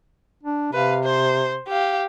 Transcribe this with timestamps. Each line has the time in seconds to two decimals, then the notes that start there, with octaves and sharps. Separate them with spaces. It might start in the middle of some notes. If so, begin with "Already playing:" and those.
0.43 D4
0.73 C3 B4 F5
1.04 C5
1.68 G4 F5